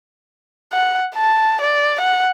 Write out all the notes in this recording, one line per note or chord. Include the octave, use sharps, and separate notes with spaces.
F#5
A5
D5
F#5